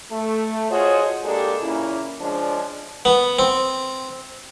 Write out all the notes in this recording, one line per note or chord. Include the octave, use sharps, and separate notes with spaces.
A3
F4 F#4 G#4 C5 C#5 D#5
G#3 A#3 D4 G4 A4
A#2 C#3 A#3 C#4 E4
F3 G#3 C#4 D4
B3
C4